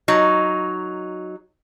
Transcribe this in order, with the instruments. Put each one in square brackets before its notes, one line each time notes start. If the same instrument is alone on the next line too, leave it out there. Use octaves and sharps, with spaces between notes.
[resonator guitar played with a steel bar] F#3 D#4